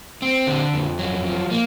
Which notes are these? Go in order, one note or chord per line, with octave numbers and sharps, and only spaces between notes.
C4
D3
F2
F#3
F3
A#3